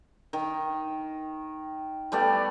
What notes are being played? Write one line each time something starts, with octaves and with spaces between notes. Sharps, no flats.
D#3
G3 A3 B3 D5